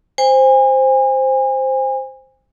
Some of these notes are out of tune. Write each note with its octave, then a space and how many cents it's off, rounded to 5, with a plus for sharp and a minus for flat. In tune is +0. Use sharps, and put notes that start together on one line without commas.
C5 +0 G#5 -35